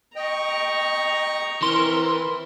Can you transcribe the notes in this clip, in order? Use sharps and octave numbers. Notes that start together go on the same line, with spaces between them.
D#5 G5 A#5 C#6
E3 C4 A#4 C6